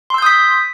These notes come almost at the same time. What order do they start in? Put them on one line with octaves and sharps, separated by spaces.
C6 E6 G6 D#6 B6